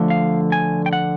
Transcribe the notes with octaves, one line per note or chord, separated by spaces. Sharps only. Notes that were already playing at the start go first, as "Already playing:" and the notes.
Already playing: D3 F3 A3
F5
G#5
G5
F#5